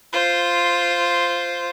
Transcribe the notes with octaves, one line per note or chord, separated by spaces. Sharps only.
F4 C5